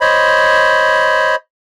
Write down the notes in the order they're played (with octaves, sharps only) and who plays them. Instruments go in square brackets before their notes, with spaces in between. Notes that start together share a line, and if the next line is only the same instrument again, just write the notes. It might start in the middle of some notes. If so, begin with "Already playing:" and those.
[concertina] C5 C#5 D#5 B5